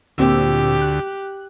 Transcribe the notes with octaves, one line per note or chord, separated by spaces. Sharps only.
D2 A#2 C4 G4 E6
F#6